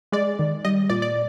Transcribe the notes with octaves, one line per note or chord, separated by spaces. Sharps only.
G#3 D5
D#3
G3 D#5
A#2 D5
D5